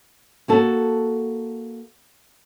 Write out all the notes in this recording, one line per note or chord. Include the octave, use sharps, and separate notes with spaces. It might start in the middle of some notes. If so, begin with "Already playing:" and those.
A#3 F#4 A4